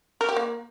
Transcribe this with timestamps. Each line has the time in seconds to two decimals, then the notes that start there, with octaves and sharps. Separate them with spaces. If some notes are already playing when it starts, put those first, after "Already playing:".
0.21 A#4
0.29 G4
0.36 A#3